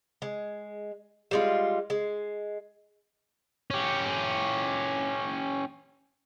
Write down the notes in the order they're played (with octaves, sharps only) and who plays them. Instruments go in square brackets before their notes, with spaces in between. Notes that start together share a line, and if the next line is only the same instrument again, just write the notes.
[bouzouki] G#3
G3 G#3 F4
G#3
[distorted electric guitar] C#4 G4